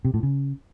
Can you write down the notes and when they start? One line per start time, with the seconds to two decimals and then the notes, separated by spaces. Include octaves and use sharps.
0.05 C3
0.14 A2
0.23 C#3